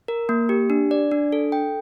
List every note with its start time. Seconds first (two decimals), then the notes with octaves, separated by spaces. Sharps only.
0.08 A#4
0.29 A#3
0.49 G4
0.70 D4
0.91 D5
1.11 D4
1.32 A4
1.52 G5